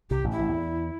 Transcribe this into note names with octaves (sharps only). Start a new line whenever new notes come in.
C2 C3 G4
A1 A2
E4
A1 A2
E2